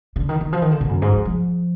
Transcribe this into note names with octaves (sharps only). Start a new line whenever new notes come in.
D3
D#3
D#3
F3
D#3
D3
A#2
F#2
G#2
F3
F3